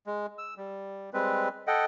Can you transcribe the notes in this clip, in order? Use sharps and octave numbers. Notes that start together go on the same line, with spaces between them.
G#3
E6
G3
G3 G#3 C4 B4
A4 D#5 F#5 G5